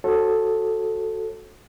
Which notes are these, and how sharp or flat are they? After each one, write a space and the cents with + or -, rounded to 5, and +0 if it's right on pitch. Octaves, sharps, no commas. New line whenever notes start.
F#4 +0 A4 +0 C#5 -45